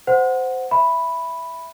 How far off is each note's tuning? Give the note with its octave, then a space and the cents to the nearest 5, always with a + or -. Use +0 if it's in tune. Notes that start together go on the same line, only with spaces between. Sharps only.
C5 -15 F#5 +0
E5 +0 B5 +0